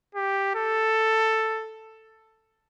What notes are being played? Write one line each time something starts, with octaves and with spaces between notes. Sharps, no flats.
G4
A4